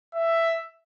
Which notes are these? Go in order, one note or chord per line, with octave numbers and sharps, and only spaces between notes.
E5